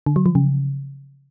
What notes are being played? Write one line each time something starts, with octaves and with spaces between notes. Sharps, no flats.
D3
F#3
F3
C#3